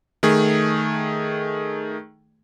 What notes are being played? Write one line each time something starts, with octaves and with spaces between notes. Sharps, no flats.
D#3 A3 G#4